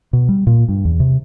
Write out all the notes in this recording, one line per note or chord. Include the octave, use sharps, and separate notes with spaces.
B2
G3
A#2
G2
E2
C3